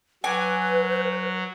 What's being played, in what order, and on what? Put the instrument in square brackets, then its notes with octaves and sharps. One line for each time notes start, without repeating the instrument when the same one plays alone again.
[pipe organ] F#3 [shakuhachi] B4 [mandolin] G#5 D6